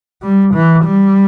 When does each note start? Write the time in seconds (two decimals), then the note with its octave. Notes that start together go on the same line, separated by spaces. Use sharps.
0.23 G3
0.54 E3
0.85 G3